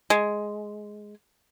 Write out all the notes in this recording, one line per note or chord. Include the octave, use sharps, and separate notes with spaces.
G#3